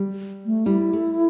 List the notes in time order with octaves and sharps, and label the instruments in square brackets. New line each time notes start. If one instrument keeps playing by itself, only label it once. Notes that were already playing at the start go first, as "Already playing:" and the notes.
Already playing: [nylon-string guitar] G3
[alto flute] A3
[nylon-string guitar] G3 [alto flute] E4
[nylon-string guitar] A3